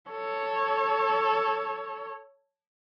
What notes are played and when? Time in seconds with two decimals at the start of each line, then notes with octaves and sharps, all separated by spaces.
0.10 A4 C#5